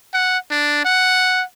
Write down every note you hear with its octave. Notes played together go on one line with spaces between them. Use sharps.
F#5
D4
F#5